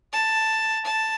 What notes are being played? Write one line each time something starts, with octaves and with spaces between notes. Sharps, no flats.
A5
A5